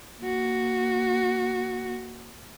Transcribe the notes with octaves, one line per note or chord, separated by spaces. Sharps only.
A#3 F#4